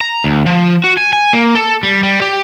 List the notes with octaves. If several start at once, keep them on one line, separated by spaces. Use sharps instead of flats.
A#5
D2
F3
F#4
G#5
G#5
A#3
A4
G3
G3
G4